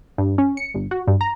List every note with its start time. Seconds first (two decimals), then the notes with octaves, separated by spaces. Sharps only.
0.18 G2
0.38 C#4
0.57 C#7
0.74 G1
0.91 F#4
1.07 G2
1.21 A#5